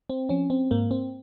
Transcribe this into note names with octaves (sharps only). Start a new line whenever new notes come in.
C4
F3 C#4
C4
G#2 A#3
C4